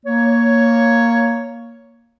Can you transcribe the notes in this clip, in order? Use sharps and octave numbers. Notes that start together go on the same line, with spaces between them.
A#3 C#5